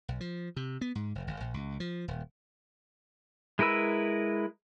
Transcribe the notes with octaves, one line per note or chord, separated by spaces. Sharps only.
B1
F3
C3
B3
G#2
F1
G1
A#1
C#2
F3
D#1
G#3 E4 A#4 B4 E6